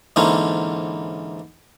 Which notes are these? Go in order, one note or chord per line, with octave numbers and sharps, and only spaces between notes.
G#2 D3 E3 A#3 C4 C#4